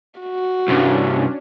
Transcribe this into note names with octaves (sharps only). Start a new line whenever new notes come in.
F#4
C2 G2 C#4 D4